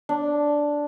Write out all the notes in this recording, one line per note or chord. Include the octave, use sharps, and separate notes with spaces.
D4